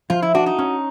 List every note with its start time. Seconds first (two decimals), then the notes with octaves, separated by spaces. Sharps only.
0.10 F3 F4
0.22 E4
0.35 D4 F#4
0.46 D#4
0.59 C#4